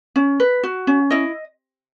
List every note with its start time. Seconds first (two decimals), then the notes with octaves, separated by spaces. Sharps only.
0.16 C#4
0.40 B4
0.63 F#4
0.87 C#4
1.10 E4 D#5